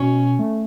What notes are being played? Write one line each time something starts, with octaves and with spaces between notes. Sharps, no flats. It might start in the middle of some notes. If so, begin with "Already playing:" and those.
Already playing: B2 C#4
A3